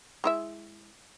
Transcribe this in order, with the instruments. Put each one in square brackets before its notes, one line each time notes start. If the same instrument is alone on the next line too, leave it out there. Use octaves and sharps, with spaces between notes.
[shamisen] G#3 E4 E5